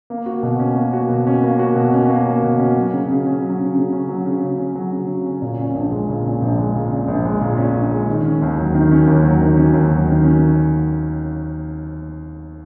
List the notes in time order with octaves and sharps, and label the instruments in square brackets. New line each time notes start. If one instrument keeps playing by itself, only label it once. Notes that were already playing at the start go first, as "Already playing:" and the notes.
[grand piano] A#3
F#4
B2
C#4
A#3
F#4
B2
C#4
A#3
F#4
B2
C#4
A#3
F#4
B2
C#4
F#3
C#3
C#3
C#4
F#3
C#3
C#3
C#4
F#3
C#3
C#3
C#4
F#3
C#3
C#3
C#4
A#2
C#4
A#1
G#3
A#2
C#4
A#1
G#3
A#2
C#4
A#1
G#3
A#2
C#4
A#1
G#3
D#3
C#4
D#2
F#3
D#3
C#4
D#2
F#3
D#3
C#4
D#2
F#3
D#3
C#4